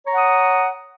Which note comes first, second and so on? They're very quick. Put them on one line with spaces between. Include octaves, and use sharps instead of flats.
C#5 A#5 F#5 D#6